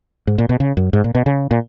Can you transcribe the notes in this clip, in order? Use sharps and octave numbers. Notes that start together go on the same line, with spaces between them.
G#2
A#2
B2
C#3
F#2
G#2
A#2
B2
C#3
A#2